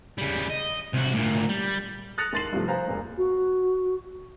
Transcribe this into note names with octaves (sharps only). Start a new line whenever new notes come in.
C#3 G3
D#5
C2 F#4
D2 A#2
G3
D#6 F#6 A6 A#6 C#7 F7
D#2 C6 A6 C7 F#7
G2 C3 F3 A3
B4 C5 F5 G#5 A#5
E1 A#2
F#4